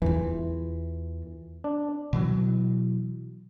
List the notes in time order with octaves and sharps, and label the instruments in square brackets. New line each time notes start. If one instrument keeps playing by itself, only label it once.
[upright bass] E2 F4 [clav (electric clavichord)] E3
[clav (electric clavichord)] D4
[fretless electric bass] B2 E3 F#3